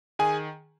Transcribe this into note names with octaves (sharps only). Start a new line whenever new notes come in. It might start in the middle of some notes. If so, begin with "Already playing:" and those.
D#3 G#4 G#5